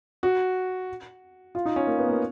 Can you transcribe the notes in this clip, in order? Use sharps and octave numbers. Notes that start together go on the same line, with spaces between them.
F#4
F4
D#4
C#4
A#3
B3
A#3